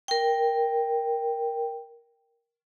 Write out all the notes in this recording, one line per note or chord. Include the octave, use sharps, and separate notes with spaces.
A#4 G5